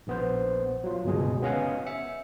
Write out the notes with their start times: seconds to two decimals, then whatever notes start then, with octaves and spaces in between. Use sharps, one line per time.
0.07 A#1 B3 C5
0.84 F#3 F4
1.04 G1 C#2 B2 G#4
1.42 B3 C#4 D#5 F5 F#5 G#5
1.86 E5 C#7